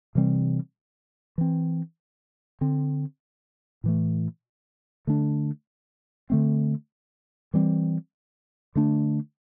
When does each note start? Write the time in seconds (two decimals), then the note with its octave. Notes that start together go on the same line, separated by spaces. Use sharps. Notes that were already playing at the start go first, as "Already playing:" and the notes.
0.15 C3 E3 G3 C4
1.38 E3 C4
2.61 D3 C4
3.84 A2 E3 A3
5.07 D3 A3 D4
6.30 D3 A3 C4
7.54 E3 G3 C4
8.75 D3 A3 D4